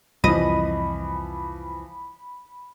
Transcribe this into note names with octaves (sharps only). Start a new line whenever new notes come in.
C2 F2 E3 F3 D#5 B5